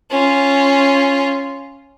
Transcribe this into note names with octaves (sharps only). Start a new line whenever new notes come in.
C#4 F4